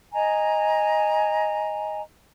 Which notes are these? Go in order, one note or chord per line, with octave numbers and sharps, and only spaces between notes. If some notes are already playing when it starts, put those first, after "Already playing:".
D#5 G#5 A#5